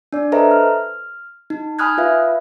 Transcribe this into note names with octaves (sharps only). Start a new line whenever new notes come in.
D4 D5
A4 B4 C5 D#5 E5 A#5
F6
D#4
G#5 B5 D#6 F6 F#6 G#6
F4 B4 E5 F5